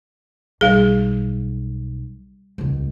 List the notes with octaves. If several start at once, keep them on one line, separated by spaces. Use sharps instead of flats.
B1 G3 G#4
D#1 C#2